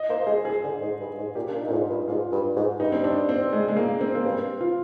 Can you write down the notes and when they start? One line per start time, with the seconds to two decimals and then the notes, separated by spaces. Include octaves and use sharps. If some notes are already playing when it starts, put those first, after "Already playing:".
Already playing: D#5
0.09 A#3 C5
0.27 G#3 G#4
0.45 G#4
0.63 D3
0.81 G#2
1.00 G2
1.17 G#2
1.35 A#2 G4
1.49 A#2 D4
1.61 D#4
1.68 A#2
1.71 G#2 F4
1.90 G2
2.08 G#2 F4
2.32 G2
2.56 G#2
2.80 G2 D#4
2.92 C4
3.04 D4
3.29 C4
3.53 G#3
3.68 G#3
3.77 A#3
4.01 C4
4.15 A#3
4.25 G2 C4
4.61 F4